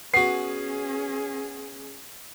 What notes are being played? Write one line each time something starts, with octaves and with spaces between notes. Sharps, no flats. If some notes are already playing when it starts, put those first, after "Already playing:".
B3 C#4 F#4 G#4 C7